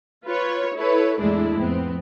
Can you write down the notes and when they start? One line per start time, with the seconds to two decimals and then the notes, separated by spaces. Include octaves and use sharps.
0.25 F4 B4 C#5
0.75 E4 A4 B4 C#5
1.19 E2 A2 G#3 A3 D4 E4
1.60 F2 B3 C4